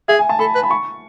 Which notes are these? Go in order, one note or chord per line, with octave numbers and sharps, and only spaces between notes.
G#4 E5
G#5
A5
A4 B5
B4
B5
C#6